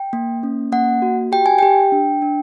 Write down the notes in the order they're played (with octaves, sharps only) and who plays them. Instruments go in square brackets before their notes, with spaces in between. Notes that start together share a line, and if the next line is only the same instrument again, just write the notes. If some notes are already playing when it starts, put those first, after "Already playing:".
Already playing: [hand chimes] G5
A#3
C#4
A#3 F#5
F#4
G4 G5
G#5
G4 G5
D4
D4